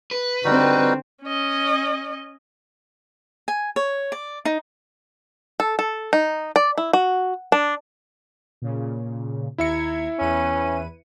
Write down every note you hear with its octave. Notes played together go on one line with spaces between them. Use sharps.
B4
D3 G3 C4 D#4 F#4
C#4 D#5
G#5
C#5
D5
D#4
A4
A4
D#4
D5
E4
F#4
D4
A#2 C#3
D#2 E4 E5 A#5 G#6 C#7
E2 C#4 B4 D#7